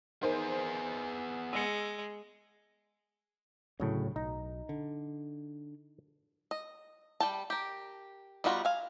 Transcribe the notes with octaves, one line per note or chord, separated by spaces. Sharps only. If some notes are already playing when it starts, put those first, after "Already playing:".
B3 D#4 G#4 A#4 C5
G#3 E6 C#7
D2 A2 C#3 F#3
B1 D#4
D3
D#5
G3 G5 A5
G4 A#4
G3 B3 D#4 F4 F#4
F5 G#5